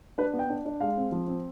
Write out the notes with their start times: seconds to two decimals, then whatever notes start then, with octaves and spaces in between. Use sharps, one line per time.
0.18 D4 B4
0.33 B3
0.39 G5
0.50 D4
0.65 D4
0.81 G#3 F5
0.97 C4
1.12 F3
1.28 C4